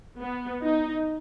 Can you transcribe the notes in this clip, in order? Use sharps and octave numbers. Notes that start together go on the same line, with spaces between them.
B3
D#4